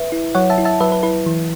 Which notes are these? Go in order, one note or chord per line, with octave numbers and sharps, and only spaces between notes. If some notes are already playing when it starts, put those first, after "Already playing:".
Already playing: B4 E5
E4
F#3 C#5 F#5
E5 A5
E4
E5 A5
F#3 B4 E5
B4
E4 B4
E3